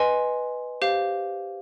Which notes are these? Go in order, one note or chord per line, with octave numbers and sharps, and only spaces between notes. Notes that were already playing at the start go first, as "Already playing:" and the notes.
Already playing: B4 D#5 G#5 C6
G4 C5 F5